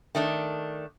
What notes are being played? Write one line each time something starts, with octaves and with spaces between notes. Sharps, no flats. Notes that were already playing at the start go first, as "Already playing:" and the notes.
D#3 A3 D4